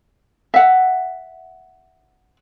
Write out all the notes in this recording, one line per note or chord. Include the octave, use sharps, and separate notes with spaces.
E5 F#5